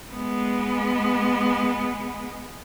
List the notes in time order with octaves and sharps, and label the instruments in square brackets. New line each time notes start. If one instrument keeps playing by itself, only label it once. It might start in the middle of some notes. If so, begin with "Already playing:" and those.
[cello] G#3 B3